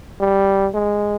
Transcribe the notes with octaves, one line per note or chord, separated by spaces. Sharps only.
G3
G#3